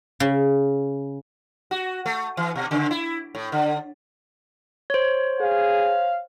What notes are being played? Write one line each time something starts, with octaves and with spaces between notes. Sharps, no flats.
C#3
F#4
A3
E3
B2
C#3
E4
A2
D3
C5 C#5
G#4 F5